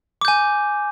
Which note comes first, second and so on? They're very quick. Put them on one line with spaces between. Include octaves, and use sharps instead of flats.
D6 G6 G#5